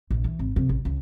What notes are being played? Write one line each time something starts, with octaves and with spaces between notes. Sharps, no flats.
A#1 A3
E3
G#1
F2 C3
A1
C#2